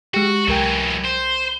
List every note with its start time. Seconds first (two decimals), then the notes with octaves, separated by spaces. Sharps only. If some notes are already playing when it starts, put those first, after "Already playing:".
0.14 G#3 F#4 G4
0.48 C2 E3 F#3 A#4 G5
1.05 C5